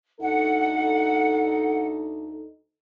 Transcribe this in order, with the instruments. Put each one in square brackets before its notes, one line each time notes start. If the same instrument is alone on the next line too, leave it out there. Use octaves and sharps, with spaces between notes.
[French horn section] D2 D#4 A4 [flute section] F#5